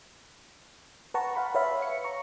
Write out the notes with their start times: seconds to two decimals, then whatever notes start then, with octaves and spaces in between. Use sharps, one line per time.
1.14 B4 F#5 A5 A#5 C#6
1.35 F5 F#5 B5 C6
1.55 B4 C#5 E5 F5 B5
1.82 C#7
2.04 A#5 C#6